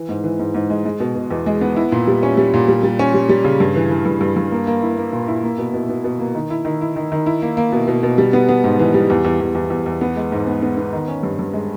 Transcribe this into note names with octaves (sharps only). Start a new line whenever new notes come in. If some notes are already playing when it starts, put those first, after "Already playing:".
Already playing: E3
G#2
E3
G#2
G#2
G#3
G#3
B2
B2
E2
G#3
B3
E4
A#2
G3
C#4
G3
A#2
G3
G3
C#4
G3
G3
C#3
G2
E3
E3
G2
G2
G2
A#3
A#3
E4
A#3
A#2
E4
A#3
B2
B2
B2
B2
A#3
D#3
E4
D#3
E4
D#3
D#3
E4
A#3
A#3
B2
B2
B2
G3
B3
B3
G#2
E3
G3
E2
E2
E2
E2
E2
E2
B3
G#3
G#2
B3
B3
B3
D#3
C#4
G2
G2
G#3